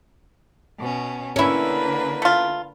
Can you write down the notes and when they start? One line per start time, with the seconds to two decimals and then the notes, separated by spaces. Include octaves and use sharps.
0.79 B2 C#4
1.36 D3 A#3 C#4 E4 B4
2.22 A3 F4